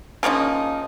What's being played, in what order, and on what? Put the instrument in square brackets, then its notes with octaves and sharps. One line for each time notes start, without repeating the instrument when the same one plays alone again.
[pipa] C#3 F3 A#3 D#4